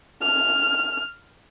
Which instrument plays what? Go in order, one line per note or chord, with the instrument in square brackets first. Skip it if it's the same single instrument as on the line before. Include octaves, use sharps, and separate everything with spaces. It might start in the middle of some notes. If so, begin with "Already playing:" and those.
[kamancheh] F6